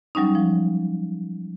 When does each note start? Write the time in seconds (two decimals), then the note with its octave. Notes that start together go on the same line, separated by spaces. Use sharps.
0.15 F#3 G3 C#4 D#4
0.35 F3